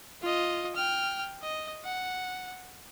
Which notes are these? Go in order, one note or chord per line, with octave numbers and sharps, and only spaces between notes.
F4 D#5
G5 F6
D#5
F#5